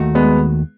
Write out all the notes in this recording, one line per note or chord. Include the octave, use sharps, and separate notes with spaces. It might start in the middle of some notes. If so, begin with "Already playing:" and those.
Already playing: D#2 D#3 A3 D#4 F#4
G#3 B3